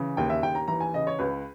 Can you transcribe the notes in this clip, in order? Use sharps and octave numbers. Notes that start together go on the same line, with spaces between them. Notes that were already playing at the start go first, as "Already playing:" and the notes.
Already playing: C#3 E3
D#2 G5
E5
D#2 G5
A#5
E3 A#5
G#5
C#3 D#5
C#5
C#2 B4